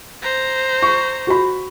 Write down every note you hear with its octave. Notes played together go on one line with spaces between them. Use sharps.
C5 A#5
C#6
F#4 B5